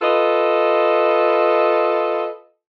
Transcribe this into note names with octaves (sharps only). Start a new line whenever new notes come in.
F4 A4 B4 D#5